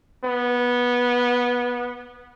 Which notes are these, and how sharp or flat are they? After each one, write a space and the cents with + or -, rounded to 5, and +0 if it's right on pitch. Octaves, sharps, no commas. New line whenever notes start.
B3 -15